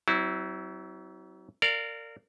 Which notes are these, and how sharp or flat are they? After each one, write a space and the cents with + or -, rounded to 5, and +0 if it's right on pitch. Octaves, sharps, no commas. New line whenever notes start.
F#3 +35 C4 -5 E4 -25
A#4 -25 D5 +0 F5 +0